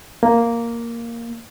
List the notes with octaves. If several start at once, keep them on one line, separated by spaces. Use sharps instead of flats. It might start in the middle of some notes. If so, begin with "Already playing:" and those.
A#3